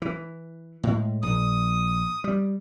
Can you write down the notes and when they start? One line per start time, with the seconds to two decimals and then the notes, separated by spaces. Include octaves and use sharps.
0.02 E3
0.83 A2 G#3
1.23 A#1 D#6
2.24 G3